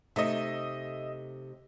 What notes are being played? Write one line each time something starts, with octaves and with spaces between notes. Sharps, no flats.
C3 A3 D#4 D#5 E5